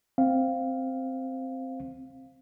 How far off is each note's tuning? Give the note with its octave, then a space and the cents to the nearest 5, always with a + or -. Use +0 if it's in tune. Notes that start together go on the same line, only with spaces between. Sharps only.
C4 +0 F5 +0